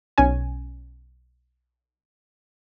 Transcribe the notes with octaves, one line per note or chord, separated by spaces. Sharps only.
B1 C#4 G#5